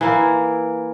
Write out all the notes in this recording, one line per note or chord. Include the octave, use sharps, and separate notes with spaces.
E3 A#3 E4